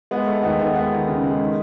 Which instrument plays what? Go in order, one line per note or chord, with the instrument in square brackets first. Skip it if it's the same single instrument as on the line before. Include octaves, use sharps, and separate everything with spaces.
[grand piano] G#3 B3
G#3 A3
D#2 B3
D#2 B3
G#3 B3
D#2
C#3
G#3
D#3